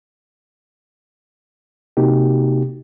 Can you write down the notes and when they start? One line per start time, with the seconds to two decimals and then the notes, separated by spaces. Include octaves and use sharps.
1.97 C3 A#3 D#4 F#4 G4